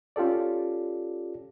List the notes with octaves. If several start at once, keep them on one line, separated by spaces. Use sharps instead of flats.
C#4 F4 G4 A4 D5